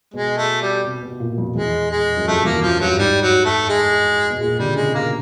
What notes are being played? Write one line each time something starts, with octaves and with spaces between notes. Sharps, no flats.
B2 G#3
A3
G3
C3
B2
A#2
F2
E2 G#3
G#3
F#2
F2 A3
E2 A#3
F#2 F3
G2 F#3
G#2 G3
F#3
A3
G#3
B2
A#2 G#3
D3 G3
C#3 G#3
C3
B2 A#3